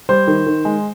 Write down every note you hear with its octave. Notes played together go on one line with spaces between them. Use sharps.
G3 C5
D#3
D#3
G#3